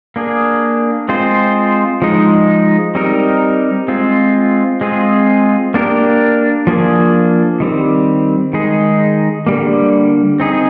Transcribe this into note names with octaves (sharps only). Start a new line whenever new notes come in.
A#3 D4 G#4
G#3 C4 F4 C5
F3 G#3 D#4
G3 C4 D#4 A#4
G#3 C4 F4
G#3 C4 F4 G#4
A#3 D4 G4 A#4
F3 A#3 D4 G#4
D#3 G3 C4
D#3 G#3 D#4 G#4
D3 G3 A#3
C4 D#4 G#4